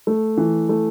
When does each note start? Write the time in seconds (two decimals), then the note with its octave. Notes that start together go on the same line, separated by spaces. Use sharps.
0.07 A3
0.37 E3
0.69 A3